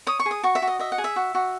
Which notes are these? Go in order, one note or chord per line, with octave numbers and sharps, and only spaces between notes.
C#5 D#6
C#6
G#4
D#6
F#4 C#6
E5
F#4
D#5
D#5 E5
F#5
G#4
E5
F#4
F#4